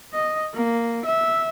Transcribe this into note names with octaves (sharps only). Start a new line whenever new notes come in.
D#5
A#3
E5